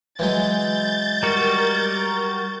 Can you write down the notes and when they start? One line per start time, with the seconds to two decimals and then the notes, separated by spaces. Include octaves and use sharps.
0.19 E3 F#3 G#3 G6 A6
1.23 G3 F#4 A#4